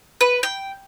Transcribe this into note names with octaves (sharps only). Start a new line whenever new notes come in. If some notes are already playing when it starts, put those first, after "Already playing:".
B4
G5